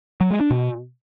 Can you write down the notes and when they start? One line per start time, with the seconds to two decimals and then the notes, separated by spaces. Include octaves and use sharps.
0.21 F#3
0.31 G#3
0.41 D4
0.51 B2